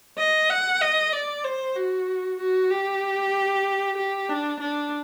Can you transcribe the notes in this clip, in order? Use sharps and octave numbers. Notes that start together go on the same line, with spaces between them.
D#5
F#5
D#5
D5
C5
F#4
F#4
G4
G4
D4
D4